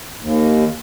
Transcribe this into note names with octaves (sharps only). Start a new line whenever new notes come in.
D#2